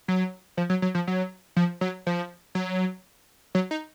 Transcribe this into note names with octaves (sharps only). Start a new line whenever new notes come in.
F#3
F3
F#3
F#3
F3
F#3
F3
F#3
F3
F#3
F#3
D#4